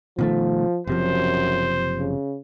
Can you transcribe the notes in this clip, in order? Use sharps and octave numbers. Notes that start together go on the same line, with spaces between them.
B2 D#3 F3 A3
F#1 F#2 C3 F3 C5
C#3